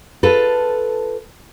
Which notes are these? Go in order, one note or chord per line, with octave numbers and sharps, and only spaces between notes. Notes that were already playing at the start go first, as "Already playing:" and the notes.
F4 A4 B4